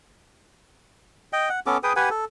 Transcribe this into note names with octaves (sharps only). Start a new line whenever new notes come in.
D#5 G5
F#5
B3 C#4 A4 D6
G#4 B4 G5 D#6
G4 B4 F#5 G#5
A4